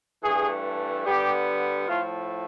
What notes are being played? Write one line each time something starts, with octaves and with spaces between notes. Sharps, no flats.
G2 E3 A3 G#4
D3 G3 B3 G4
A2 F3 A3 F4